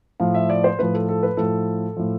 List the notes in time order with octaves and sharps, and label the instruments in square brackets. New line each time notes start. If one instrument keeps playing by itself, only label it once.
[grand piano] A2 F3 F5
E5
D5
C5
A2 F3 B4
A4
A4
B4
A2 F3 A4
A2 F3